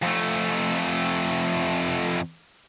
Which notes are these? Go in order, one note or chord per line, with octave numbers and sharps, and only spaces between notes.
F2 A3